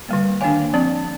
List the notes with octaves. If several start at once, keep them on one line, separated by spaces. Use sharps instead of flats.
D3 G3 A#3
D#3 A#3 D4 F5 G#5
F3 C4